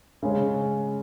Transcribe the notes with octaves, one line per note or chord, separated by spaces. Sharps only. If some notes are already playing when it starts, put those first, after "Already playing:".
C#3 G#3 C#4